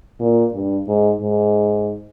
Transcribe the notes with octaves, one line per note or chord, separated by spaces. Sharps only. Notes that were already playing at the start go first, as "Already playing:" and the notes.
A#2
G2
G#2
G#2